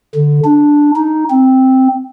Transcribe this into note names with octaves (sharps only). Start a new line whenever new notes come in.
D3
D4
D#4
C4